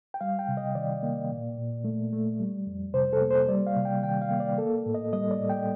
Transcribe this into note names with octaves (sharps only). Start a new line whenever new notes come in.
G5
G3 F5
G5
C3
D#5
D#3 D5
A#3
A#2
A#2
A3
A3
G3
F2
C3 C5
A4
A#3
C5
G3 D5
F5
C3
G5
D#3 G5
F5
A#3
D5
A#3 A4
A2
D#5
G3 D#5
D5
A2
G5